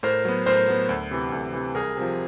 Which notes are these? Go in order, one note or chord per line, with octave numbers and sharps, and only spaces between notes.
A2 A#4 C5
F#3 B3
A2 A#4 C5
F#3 B3
D2
C3 E3
D2
C3 E3
C2 G#4 A#4
C3 F3